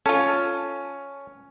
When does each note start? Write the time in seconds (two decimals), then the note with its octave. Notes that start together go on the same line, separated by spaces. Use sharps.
0.06 C#4 F4 A4